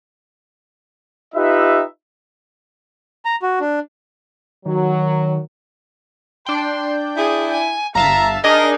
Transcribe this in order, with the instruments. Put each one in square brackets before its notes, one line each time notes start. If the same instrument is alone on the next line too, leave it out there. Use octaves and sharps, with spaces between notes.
[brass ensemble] D#4 F4 G4 B4 E5
[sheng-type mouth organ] A#5
F#4
D4
[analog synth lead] D#3 [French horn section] F#3
[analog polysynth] D4 G5 [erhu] C6
[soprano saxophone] E4 [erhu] G#4
[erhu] G#5
[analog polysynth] G1 E5 A5 [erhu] F5 [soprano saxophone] A#5
[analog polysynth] D4 G#4 A#4 [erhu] D#4 [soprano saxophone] D#5